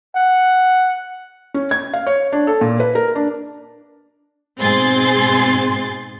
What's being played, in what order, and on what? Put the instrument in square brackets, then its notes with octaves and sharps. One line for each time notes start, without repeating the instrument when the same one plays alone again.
[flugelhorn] F#5
[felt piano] C#4
G#6
F5
C#5
D4
A4
A#2
B4
A#4
D4
[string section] G#2 B2 C4 G#4 C6 A6